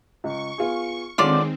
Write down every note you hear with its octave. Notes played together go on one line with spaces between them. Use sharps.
C#2 C#6
B3 F4 G#4
D3 D#3 G#3 C4 F4 C#5 D5